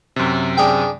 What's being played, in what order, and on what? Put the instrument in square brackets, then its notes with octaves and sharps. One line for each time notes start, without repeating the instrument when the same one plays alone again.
[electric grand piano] F#2 C3
[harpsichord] D4 G#4 G5